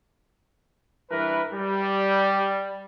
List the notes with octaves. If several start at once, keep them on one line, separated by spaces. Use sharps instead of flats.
G2 E3 A#4 B4
G3